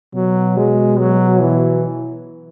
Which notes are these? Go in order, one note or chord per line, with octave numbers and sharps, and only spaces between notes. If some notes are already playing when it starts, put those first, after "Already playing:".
B2 F#3
G#3
F#3
E3